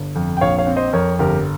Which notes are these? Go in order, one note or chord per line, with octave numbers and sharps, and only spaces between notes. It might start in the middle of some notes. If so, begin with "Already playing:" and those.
Already playing: G1
F2
G5
A#1 C#5 F5
C#5 F5
C4
C5 D#5
F2 A#4 C#5
G1 G4 A#4